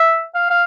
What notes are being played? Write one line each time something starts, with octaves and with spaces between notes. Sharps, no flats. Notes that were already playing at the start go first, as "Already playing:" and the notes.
Already playing: E5
F5
F5